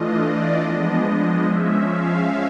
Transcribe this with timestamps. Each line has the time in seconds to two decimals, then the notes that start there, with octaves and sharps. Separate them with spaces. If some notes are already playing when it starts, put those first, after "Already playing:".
Already playing: E3 A3 D4 F4 D#5
0.21 D5
0.62 F3 G#3 B3 D4 D#5
1.44 F3 G#3 C#4 E5
1.84 F5